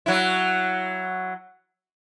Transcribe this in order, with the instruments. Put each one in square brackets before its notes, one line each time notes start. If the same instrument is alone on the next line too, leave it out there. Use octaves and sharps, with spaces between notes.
[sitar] F#3 E4